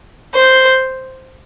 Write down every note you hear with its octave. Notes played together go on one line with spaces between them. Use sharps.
C5